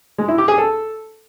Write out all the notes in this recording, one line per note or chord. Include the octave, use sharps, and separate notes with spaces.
G#3
E4
G4
G#4
A4